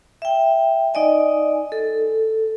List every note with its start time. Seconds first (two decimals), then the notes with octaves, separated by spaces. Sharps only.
0.22 E5 G5
0.94 D#4 D5 D#5 G#5
1.72 A4